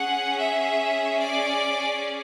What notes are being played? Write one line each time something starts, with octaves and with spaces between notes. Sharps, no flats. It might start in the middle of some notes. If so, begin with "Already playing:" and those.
Already playing: C#4 G#4 F#5
E5
D5